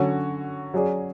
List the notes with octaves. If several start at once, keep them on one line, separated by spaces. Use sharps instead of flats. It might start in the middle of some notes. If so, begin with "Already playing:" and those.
Already playing: D3 F#3 C#4 F#4 C#5
F#3 C#4 G#4 D5